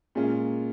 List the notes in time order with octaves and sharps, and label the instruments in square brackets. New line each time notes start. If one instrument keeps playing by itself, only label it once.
[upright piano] A#2 G#3 C#4 F4